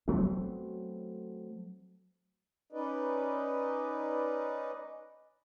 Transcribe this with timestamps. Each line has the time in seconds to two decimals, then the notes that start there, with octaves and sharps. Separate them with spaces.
0.08 F#3 A3 B3 C4
2.72 C#4 D#4 B4 D5 D#5